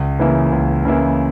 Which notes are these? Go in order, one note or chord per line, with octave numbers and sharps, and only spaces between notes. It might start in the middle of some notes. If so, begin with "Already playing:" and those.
Already playing: C#2
C#3 E3 A#3 E4
C#2
C#3 E3 A#3 E4